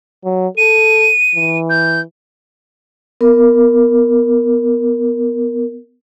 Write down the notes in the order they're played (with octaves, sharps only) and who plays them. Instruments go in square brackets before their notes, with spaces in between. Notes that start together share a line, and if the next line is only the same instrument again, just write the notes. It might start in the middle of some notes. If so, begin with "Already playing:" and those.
[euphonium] F#3
[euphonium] A4 [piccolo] D#7
[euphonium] E3
[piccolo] G6
[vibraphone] B3 A#4